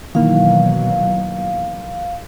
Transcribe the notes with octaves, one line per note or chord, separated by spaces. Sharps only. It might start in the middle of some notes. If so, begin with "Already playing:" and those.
B2 D#3 E3 F#3 A#3 F5